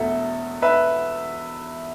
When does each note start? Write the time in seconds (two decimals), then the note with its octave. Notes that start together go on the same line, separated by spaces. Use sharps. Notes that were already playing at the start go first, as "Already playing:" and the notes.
Already playing: E1 E2 B2 A3 E4 A4
0.62 B4 E5